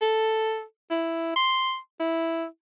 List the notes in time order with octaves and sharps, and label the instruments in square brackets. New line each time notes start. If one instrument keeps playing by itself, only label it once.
[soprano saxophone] A4
E4
C6
E4